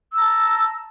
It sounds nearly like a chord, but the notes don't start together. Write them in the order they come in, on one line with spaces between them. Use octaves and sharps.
E6 A#5 A5